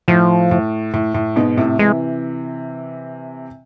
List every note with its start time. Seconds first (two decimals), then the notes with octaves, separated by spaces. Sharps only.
0.08 A2 F3
0.51 A2
0.94 A2
1.14 A2
1.36 G#2 B2
1.57 A2 C3
1.79 C3 E3 G#3